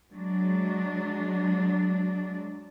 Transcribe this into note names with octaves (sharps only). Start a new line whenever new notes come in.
F#3 G#3 D4